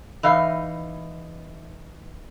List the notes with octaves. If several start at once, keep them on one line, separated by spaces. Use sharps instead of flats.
E3 D#4 F5